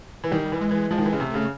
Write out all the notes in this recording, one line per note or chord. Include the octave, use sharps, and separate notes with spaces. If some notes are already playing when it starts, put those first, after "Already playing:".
E3
D#3 G3
E3
G#3
E3
F3 G#3
D#3
E3
C#3
C3 A3
C#3